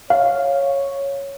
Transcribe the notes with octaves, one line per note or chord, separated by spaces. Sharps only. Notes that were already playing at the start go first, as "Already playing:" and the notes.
C#5 F5